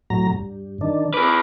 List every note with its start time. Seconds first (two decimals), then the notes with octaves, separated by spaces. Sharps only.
0.10 A2 F#3 A#5
0.33 G2
0.81 D#3 D4
1.14 G#4 B4 D6